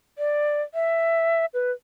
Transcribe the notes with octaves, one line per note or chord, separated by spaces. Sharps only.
D5
E5
B4